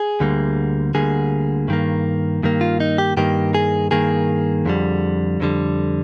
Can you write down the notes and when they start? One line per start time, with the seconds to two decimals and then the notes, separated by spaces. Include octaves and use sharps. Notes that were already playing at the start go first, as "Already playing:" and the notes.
Already playing: G#4
0.20 D2 D3 G3 A#3
0.94 D2 D3 G3 A#3 G#4
1.68 G2 D#3 A#3
2.43 G2 D#3 A#3
2.61 F4
2.80 D#4
2.98 G4
3.17 G2 D#3 A#3 G4
3.54 G#4
3.91 G2 D#3 A#3 G#4
4.66 F2 D3 G3
5.40 F2 D3 G3